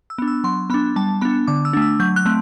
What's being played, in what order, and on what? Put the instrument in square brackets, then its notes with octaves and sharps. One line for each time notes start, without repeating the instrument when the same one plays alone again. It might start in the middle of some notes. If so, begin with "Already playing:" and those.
[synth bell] E6
B3 D4
E6
F#3 C6
B3 D4 B5
G3 A5
B3 D4 B5
D3 D6
E6
A3 D4
E6
F#3 G6
F#6
A3 C4